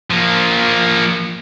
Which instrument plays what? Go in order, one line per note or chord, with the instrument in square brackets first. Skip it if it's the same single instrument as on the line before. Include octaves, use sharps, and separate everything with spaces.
[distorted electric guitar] F3 A#3